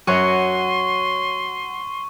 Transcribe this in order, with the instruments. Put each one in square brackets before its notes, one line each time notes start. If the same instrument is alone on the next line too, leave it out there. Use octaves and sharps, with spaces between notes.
[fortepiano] F#2 [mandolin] F#4 C#5 [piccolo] C6 [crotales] C#6